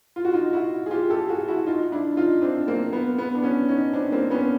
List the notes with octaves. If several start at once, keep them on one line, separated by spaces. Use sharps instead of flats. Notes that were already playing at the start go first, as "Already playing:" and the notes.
F4
F#4
D#4 F4
E4 F#4
G#4
F4 G4
G4 A4
F#4 G#4
E4 F#4
D#4 F4
D4 E4
D#4 F4
C4 D4
A#3 C4
B3
B3
D4
B3 C#4
C#4 D#4
C4 D4
A#3 C4
B3 C#4